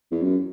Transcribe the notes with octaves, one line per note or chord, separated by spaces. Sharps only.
E2
F#2